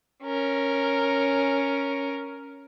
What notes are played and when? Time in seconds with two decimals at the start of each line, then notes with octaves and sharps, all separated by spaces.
0.24 C#4 A#4